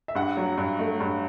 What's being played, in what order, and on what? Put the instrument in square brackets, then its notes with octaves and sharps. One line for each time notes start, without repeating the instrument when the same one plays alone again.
[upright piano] E5
G2 F#5
F#3
G2
A3
G2